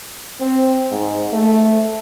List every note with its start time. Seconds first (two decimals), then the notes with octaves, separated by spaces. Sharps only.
0.41 C4
0.91 G#2
1.33 A3